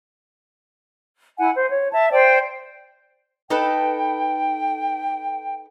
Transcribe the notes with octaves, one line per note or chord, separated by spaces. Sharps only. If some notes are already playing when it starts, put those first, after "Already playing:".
E4 F#5 G#5
C5
C#5
E5 A5
C5 D5 G5
D#4 A4 B4 G5